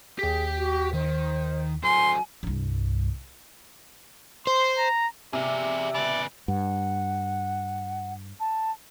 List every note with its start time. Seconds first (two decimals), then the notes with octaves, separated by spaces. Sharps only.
0.19 D#2 G4 G#4 G5 B6
0.56 F#4
0.94 D#3 C5
1.84 F#3 C4 G#5 C6
2.43 C2 G2
4.47 C5 C6
4.78 A#5
5.33 C3 G#4 D5 E5
5.94 C#3 B3 D5
6.48 G2 F#5
8.40 A5